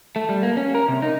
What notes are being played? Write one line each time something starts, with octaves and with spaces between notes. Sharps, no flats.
A3
G3
A#3
C#4
A#4
C3
D#4